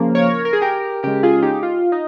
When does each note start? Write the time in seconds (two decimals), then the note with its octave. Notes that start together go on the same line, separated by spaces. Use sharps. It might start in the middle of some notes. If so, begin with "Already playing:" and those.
Already playing: C#3 F3 A#3
0.15 A#4 C#5
0.45 A#4
0.53 G#4
0.62 G4 A#4
1.03 C#3 G#3 G4 A#4
1.23 F4 G#4
1.42 D#4 G4
1.63 F4
1.92 D#4